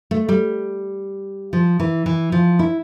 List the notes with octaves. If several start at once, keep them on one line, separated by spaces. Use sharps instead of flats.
A3
G3
F3
E3
E3
F3
E4